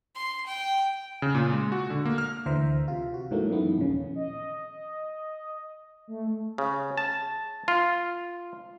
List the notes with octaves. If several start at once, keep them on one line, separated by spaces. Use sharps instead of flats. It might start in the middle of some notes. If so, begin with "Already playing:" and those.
C6
G5
C#3
A#2
G#3
F#4
D3
A#3
F6
D2 D3 E3 C5 E5 A#5
C3 F4
F#4
G#2 E3 F#3 A3 A#3
F#2 D#3 E3 B3
A#1 D#2 C#3
D#5
A3
C#3
A5
F4